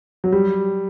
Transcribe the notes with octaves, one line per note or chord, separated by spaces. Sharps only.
F#3
G3